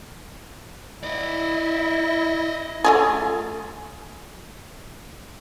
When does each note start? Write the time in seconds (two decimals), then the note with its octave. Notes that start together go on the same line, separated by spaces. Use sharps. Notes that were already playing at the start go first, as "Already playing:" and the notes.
1.03 E4 D5 D#5
2.84 A3 F4 G#4